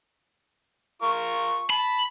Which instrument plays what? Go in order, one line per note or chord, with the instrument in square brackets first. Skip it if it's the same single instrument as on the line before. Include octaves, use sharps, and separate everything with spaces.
[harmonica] F4 A#4 C#6
[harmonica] A5 [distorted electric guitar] B5